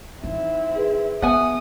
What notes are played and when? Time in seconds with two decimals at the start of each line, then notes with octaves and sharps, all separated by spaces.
0.24 E3 C4 D#4 E4
0.76 G#4 B4
1.22 B3 E5 F#5 G#5 D#6